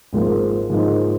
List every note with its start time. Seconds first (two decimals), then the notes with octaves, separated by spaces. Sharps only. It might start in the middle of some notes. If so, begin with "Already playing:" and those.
0.13 G#1 G#2 F3 A#3
0.70 G#2 F3 A#3 D#4